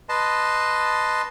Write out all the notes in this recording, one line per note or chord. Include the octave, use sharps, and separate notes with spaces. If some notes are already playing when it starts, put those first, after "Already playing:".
B4 D#5 A5 C6